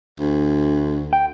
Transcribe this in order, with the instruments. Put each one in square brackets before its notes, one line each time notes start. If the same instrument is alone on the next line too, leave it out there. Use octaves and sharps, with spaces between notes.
[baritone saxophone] D2
[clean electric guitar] G5